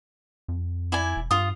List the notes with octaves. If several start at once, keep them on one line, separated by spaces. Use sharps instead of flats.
F2
E4 D5 G#5
E1
G2 F4 D#6